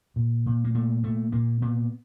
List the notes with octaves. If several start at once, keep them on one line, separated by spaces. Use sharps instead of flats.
A#2
A#2
A#3
A#2 A3
A#2 A3
A#2 A#3
A#2 B3